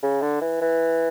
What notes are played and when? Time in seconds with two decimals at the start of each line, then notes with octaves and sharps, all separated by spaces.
0.03 C#3
0.22 D3
0.41 E3
0.61 E3